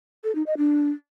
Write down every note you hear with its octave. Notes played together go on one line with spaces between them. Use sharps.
A4
D#4
D#5
D4